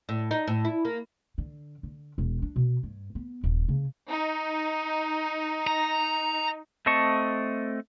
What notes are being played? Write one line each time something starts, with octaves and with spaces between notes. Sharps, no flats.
A2
D#4
A2
E4
A#3
D3
D3
E1
D4
B2
G2
B3
D#1
C#3
D#4
A#5
A3 C4 D#5 A5 C#6